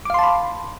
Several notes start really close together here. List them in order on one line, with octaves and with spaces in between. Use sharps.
D6 F5 C6 A5 B5